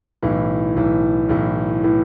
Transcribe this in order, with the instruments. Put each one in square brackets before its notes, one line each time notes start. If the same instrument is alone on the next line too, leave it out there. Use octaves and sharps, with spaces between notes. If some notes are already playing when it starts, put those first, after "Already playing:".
[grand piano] B1 A2 E3
B1 A2 E3
B1 A2 E3
A2 E3